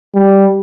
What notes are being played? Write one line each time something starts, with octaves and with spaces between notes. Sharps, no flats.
G3